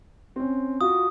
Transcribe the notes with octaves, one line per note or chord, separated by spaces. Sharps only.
C4 C#4
F4 F#4 D#6